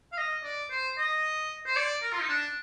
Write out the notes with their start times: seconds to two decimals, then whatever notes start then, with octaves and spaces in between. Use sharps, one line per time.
0.12 F5
0.17 D#5
0.44 D5
0.70 C5
0.98 D#5
1.66 C5
1.76 D5
2.03 A#4
2.12 F4
2.21 D#4
2.29 D4